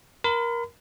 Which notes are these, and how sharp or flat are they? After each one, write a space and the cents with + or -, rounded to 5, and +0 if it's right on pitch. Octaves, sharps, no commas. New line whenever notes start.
A#4 +15 B5 +45